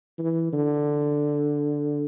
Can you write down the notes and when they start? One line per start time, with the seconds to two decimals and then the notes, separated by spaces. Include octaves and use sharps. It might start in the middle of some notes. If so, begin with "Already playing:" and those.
0.18 E3
0.52 D3